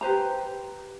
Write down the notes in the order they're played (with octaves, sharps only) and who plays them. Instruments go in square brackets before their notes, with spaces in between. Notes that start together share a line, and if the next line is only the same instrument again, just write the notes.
[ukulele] G4 B4 C5 A#5